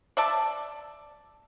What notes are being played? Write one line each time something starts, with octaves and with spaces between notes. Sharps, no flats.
D5 E5 A5